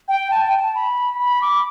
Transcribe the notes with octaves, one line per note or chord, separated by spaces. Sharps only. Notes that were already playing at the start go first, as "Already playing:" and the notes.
G5
A5
G5
A5
B5
B5
D6